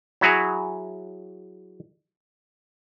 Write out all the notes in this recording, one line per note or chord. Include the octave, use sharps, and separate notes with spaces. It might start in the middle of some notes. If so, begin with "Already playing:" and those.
F#3 E4 F#4 G#4 C#5